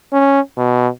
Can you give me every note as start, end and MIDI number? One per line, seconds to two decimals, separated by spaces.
0.13 0.40 61
0.57 0.88 47